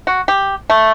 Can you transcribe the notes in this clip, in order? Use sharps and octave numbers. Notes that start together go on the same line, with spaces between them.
F#4
G4
A3